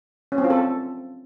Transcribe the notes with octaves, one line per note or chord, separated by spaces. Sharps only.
C#4
C4
F4
A4